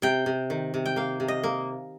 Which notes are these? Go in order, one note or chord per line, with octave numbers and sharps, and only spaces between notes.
C3 G5
C3
D#3
C3
G5
A#3 F5
C3
D#5
A#3